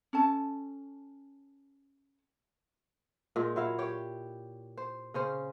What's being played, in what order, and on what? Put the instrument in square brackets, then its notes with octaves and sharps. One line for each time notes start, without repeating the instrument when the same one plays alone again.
[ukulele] C#4 A4 A5
[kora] A#2 G#3 D#4
F#3 E4 F5
G4 C#5 G5
C5
C#3 C#4 C5